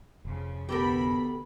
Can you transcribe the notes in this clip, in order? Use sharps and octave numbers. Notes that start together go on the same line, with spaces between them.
F1 C#3 F3
A1 D2 B3 G4 A4 A#4 B5